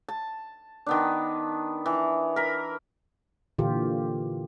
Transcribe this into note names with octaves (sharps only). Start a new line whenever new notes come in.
A5
D#3 B3 D4
E3
A#4 B5
A#2 D3 E3 F4 G4